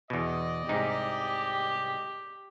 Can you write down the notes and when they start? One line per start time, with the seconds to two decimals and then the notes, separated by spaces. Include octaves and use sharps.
0.10 E2 B2 D5 D#5
0.69 C2 G#2 D#4 G4